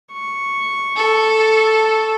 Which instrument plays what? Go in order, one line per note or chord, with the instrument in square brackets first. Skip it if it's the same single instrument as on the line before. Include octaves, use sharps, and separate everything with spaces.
[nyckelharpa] C#6
[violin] A4